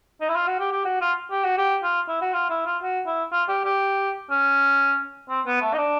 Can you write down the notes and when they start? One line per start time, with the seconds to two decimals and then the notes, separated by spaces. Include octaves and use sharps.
0.21 D#4
0.28 E4
0.35 F4
0.47 F#4
0.59 G4
0.72 G4
0.85 F#4
1.01 F4
1.31 G4
1.44 F#4
1.57 G4
1.83 F4
2.08 E4
2.21 F#4
2.33 F4
2.50 E4
2.66 F4
2.83 F#4
3.06 E4
3.32 F4
3.48 G4
3.64 G4
4.30 C#4
5.29 C4
5.46 B3
5.62 A3
5.74 D#4
5.78 D4